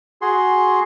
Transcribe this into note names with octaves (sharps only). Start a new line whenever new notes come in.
F#4 G#4 C6